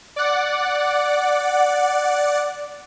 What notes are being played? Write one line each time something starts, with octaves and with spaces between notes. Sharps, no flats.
D5 F#5